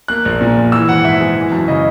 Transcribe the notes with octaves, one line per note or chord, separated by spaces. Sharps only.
A#3 F#6
A#1
A#2
A#1
E3 E6
G#1 F#5
G#2 E5
G#3
E3
F#2
C#3 D#5